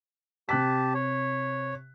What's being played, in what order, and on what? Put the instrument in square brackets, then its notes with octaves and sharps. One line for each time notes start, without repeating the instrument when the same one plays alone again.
[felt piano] C3 F#6 B6 [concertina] G4 A5
[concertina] C#5